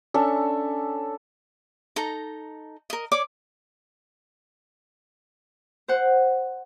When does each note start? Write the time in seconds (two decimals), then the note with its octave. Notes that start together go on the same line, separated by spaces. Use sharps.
0.14 C#4 D4 A4 E5
1.96 D#4 A4 A#5
2.90 A#4 D#5
3.12 C#5 D5 D6
5.88 C5 F#5